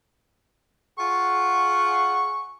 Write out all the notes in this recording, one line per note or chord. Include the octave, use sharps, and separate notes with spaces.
F4 G#4 F#5 C#6